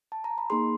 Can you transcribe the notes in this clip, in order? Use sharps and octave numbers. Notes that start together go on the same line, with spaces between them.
A5
A#5
B5
A#3 D#4 G#4 C6